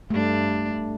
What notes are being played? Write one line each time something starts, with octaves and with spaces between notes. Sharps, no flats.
G2 A3 D4